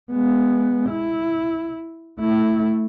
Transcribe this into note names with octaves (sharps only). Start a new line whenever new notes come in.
G#3 B3
E4
A3 E4